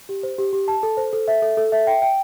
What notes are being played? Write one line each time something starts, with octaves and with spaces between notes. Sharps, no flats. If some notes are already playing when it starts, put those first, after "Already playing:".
G4
C5
G4
G4
A5
A4
C5
A4
E5
A4
A4
E5
G5
G5